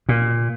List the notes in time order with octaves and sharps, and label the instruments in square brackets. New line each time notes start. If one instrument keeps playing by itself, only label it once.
[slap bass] A#2